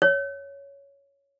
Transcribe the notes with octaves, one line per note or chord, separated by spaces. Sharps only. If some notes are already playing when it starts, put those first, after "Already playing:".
C#5